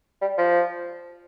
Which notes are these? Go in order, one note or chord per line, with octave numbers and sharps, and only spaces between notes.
G3
F3